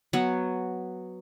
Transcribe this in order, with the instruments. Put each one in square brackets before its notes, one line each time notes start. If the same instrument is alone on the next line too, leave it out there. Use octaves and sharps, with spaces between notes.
[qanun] F#3 B3 F#5